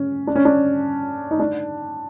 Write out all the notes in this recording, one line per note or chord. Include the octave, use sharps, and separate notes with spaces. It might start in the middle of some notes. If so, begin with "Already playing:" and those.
Already playing: C#4
D4
C#4
D4
D#4
D4